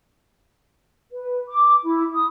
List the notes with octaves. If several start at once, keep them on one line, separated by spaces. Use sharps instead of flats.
B4
D6
E4
D#6